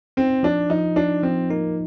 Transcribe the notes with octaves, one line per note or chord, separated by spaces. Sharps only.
C4 D#4
F3 D4
F3 D#4
D4 D#4
F3 C4
A#3 D#4